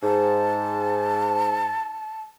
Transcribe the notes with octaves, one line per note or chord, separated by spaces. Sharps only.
G#2 A5